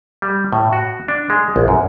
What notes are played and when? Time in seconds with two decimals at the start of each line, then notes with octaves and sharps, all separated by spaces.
0.22 G3
0.53 A2
0.73 F#4
1.08 D4
1.30 G#3
1.56 A#1
1.68 F#2